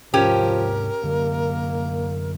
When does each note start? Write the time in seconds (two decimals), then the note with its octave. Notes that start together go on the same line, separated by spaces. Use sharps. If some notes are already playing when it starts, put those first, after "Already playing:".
0.14 G#2 C3 F3 C#4 G4 A#4
1.04 F#2 D3 A#3